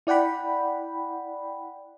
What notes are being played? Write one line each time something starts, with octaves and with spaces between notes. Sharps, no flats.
E4 D5 F#5 G5 B5